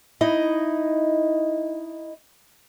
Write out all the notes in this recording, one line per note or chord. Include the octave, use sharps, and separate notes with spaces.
D#4 E4 D#5